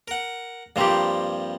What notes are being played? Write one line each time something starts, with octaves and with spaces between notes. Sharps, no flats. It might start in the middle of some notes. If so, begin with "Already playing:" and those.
A#4 F#5
G2 F3 G3 A#3 C4 G4